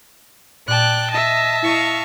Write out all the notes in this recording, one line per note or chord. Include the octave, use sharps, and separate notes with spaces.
A#2 D5 G5 A5 F#6
D#5 E5 A5
E4 D#5 F5 C#6